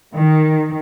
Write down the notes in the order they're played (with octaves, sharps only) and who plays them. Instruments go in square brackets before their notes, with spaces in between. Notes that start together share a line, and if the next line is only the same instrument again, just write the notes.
[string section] D#3